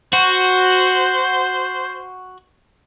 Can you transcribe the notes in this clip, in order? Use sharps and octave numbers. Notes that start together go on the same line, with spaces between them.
F#4 C5